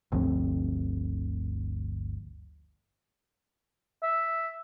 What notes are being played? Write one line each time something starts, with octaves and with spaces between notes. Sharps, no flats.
G1 D2 F3 C4
E5